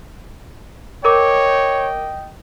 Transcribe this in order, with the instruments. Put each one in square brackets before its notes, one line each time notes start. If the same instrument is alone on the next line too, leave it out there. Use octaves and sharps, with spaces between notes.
[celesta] A#4 D6 [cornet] C#5 [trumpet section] D#5 G5